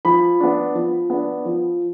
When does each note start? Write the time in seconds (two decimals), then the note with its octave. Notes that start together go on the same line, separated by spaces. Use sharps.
0.05 F3 B5
0.40 B3 D4
0.75 F3
1.10 B3 D4
1.45 F3